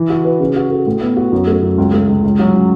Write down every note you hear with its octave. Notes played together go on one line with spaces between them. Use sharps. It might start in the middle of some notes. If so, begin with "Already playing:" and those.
Already playing: E3
F#4
B4
C#3
F#4
A4
A2
B3
F#4
F#2
A3
F#2
C#2
A3
C#2
C#2
F#3
C#4